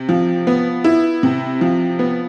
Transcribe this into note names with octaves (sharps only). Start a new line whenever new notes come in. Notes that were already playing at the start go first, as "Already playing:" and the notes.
Already playing: C3
F3
B3
E4
C3
F3
B3